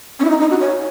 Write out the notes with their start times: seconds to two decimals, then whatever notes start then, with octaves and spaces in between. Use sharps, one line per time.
0.19 C#4
0.24 E4
0.30 D#4
0.40 D#4
0.50 F#4
0.61 C#5